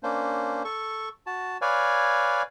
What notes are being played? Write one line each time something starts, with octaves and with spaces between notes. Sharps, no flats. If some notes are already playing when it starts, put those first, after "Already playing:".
A#3 C#4 D4 C5
A4 C#6
F#4 A5
B4 C#5 D5 F5 G#5